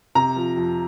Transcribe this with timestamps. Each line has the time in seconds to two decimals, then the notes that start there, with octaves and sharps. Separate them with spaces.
0.15 C3 A#5
0.36 F3
0.57 F2